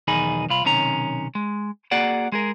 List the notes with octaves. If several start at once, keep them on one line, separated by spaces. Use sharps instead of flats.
B1 E2 D#3 D#4 G#4 B5
C2 F4 B5
B1 C3 D#3 C#4 A#5
G#3
A#3 F#4 G#4 D5 F#5
G#3 G#4 A#4